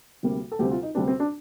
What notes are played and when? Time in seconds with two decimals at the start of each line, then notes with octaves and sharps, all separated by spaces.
0.23 D2 C3 G3 A#3
0.52 A4
0.59 D2 C3 G3 C4 G4
0.71 F4
0.83 D#4
0.95 D2 C3 G3 C4 D4
1.08 C4
1.20 D4